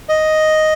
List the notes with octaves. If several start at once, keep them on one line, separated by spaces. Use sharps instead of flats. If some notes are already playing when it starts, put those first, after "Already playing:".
D#5